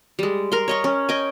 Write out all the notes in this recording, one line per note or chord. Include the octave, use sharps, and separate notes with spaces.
G3 G#3
A#4 C6
C#5 D#5 C#6
C#4
D#5 G5 G#5